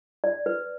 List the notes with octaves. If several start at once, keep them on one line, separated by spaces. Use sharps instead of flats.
D5
B4